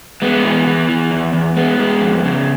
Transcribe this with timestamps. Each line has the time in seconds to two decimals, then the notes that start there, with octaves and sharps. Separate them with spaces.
0.22 G#3 B3
0.44 E3
0.67 E3
0.89 E3
1.11 E2
1.33 E2
1.56 G#3 B3
1.80 G#3
2.01 F2
2.24 C#3